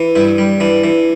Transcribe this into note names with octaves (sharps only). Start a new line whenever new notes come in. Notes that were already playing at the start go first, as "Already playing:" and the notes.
Already playing: E3
G2 E4
G3
E3 D4
E3